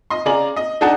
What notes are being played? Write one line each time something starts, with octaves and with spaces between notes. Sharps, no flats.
D#5 C6
C#3 G#4 D5 A#5 F#7
D#5
D4 D#4 G#4 F#5 G#5 A5